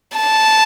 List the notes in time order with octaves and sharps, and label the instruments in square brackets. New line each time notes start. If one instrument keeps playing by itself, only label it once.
[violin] A5